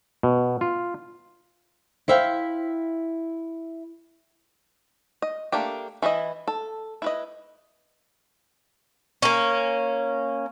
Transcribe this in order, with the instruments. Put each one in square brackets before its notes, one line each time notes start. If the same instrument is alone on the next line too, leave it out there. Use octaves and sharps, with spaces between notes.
[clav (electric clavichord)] B2
F4
[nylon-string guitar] E4 C5 E5 F5 G5
[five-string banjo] D#5
A3 A#3 D4 G4
E3 E4 F#4 D#5
A4
E4 B4 D#5
[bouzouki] A#3 C#4